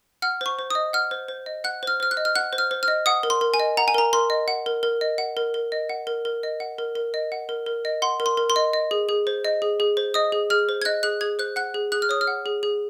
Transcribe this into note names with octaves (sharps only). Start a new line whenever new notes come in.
F#5 F6
C5 C#6
C5
D#5 D#6
F#5 F6
C5
C5
D#5
F#5 F#6
C5 F6
C5 F6
F#6
D#5
F6
F#5 F#6
C5
F6
C5
F6
D#5
F#5 D#6
A#4
C6
A#4
G#5
D#5
F#5 A#5
G#5
A#4 A#5
A#4 C6
D#5
F#5
A#4
A#4
D#5
F#5
A#4
A#4
D#5
F#5
A#4
A#4
D#5
F#5
A#4
A#4
D#5
F#5
A#4
A#4
D#5
F#5 C6
A#4
C6
A#4
C6
D#5
D#5
G#4
G#4
C5
D#5
G#4
G#4
C5
D#5 D#6
G#4
G#4 F6
C5
G#6
D#5 F#6
G#4 F#6
G#4 G#6
C5 F#6
F#5 F#6
G#4
G#4 F#6
F6
C#5 D#6
F6
F#5
G#4
G#4